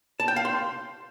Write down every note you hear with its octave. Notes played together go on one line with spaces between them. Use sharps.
A5
G5
F5
C6